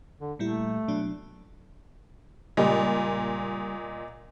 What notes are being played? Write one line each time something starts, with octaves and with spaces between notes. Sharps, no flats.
D3
A#2 G3 A3 E4
B2 F#3 D4
C#2 A#2 G3 D#5